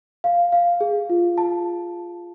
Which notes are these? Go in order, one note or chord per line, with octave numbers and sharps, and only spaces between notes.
F5
F5
G#4
F4
A5